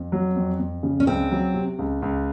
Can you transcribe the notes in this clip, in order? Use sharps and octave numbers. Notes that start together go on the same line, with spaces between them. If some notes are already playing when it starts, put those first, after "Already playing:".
Already playing: F2
F#3
F2
F2
C#3
C#4
C#2 C4
F#3
C3
C#2
C#2